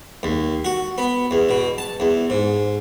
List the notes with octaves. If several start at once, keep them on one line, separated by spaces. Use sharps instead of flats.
D#2
F#4
B3
E2
B2
A5
E2
G#2